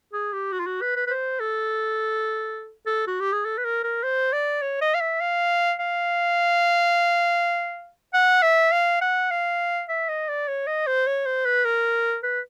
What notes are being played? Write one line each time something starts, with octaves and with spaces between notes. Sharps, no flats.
G#4
G4
F#4
F4
F#4
B4
B4
B4
C5
A4
A4
F#4
G4
G#4
A4
B4
A#4
A#4
C5
D5
C#5
D#5
F5
E5
F5
F5
F#5
E5
F5
F#5
F5
E5
D#5
D5
C#5
D#5
C5
C#5
C5
B4
A#4
B4